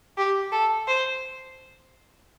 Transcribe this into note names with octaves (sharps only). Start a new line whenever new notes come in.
G4
A4
C5